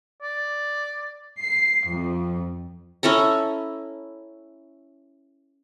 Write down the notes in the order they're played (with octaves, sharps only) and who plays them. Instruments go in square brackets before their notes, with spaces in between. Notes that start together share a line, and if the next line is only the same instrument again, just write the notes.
[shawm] D5
[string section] C7
F2
[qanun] C#4 E4 A4 A#5